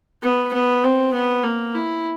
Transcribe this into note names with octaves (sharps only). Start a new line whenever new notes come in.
B3
B3
C4
B3
A#3
E4